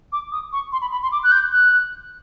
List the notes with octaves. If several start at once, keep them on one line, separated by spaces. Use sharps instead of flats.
D6
D#6
C#6
C6
B5
B5
C6
D6
F#6
G6
F#6